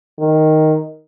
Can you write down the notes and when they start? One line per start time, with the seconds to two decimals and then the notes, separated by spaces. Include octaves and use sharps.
0.20 D#3